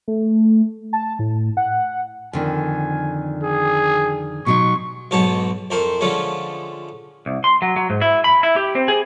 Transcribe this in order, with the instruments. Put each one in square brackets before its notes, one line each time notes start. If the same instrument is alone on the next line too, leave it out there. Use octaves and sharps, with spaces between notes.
[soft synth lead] A3
A5
A2
F#5
[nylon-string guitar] F2 D3 D#3 [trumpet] G#5
[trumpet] G#4
[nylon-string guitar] B2 F#3 D#4 [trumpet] C#6
[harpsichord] B1 G#2 B2 C#5 A5
F2 A3 A#4 C5
D3 F3 G#3 A3 C#4
[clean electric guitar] C2
C6
F#3
F#3
G#2
E4
B5
E4
G4
C4
G#4